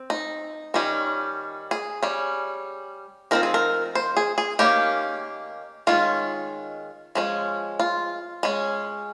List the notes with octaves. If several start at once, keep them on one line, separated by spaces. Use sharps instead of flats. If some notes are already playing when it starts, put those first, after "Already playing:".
Already playing: C4
D#4
D#3 G3 C#4
G#4
G3 C#4
F3 C4 D#4 A#4
G#4
A#4
C5
G#4
G#4
D#3 A#3 C#4 G4
D#3 G#3 C#4 F4
F3 G#3 C#4
F4
G#3 C#4